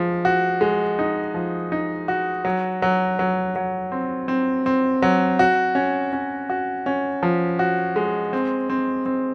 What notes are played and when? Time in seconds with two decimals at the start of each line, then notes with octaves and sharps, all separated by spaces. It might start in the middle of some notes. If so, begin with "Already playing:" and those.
Already playing: F3 G#3
0.25 F#4
0.61 G#3
0.99 D#4
1.34 F3
1.72 D#4
2.08 F#4
2.45 F#3
2.82 F#3
3.19 F#3
3.56 F#3
3.92 C4
4.28 C4
4.66 C4
5.02 F#3
5.39 F#4
5.75 C#4
6.13 C#4
6.50 F#4
6.86 C#4
7.23 F3
7.59 F#4
7.96 G#3
8.33 C4
8.70 C4
9.06 C4